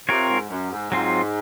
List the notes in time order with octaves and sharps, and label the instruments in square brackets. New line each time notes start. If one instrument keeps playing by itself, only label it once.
[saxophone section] C3 [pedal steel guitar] C4 F4 A#4 C#5
[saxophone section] G#2
F#2
G#2
[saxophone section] G#2 [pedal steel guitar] F#3 C4 F4